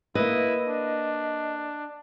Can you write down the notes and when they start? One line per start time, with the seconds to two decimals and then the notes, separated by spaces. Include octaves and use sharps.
0.15 A#3 E4 B4 D#5
0.67 D4